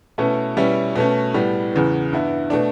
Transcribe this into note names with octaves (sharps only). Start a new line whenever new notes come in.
B2 A3 C#4 E4
B2 G3 C#4 E4
B2 A3 C#4
A2 G3 B3
E2 C#3 E3 B3
G2 E3 B3 E4
B2 A3 D4